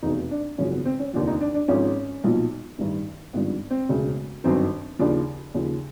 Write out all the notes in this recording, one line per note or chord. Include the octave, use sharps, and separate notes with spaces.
F1 E2 B2 D#4
D4
G#1 F#2 C#3 F3 C#4
B3
C4
C#4
F1 D#2 D3 F3 D4
D#4
D4
D4
G#1 G#2 F3 C#4
B1 A#2 F3
A1 G2 D#3
G#1 G2 D3 F3 B3
C4
E1 D2 C#3
G1 F#2 D#3 C4
D#2 C#3 F3 D4
D#2 C#3 F3